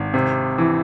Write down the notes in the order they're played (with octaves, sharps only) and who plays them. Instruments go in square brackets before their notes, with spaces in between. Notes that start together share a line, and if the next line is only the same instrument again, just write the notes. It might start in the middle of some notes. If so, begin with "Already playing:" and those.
Already playing: [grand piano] G#1
C3
E3